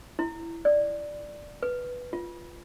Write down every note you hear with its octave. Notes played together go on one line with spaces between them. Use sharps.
E4
D5
B4
F4